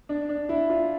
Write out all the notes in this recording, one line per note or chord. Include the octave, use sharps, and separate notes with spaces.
D4
D4
E4
F4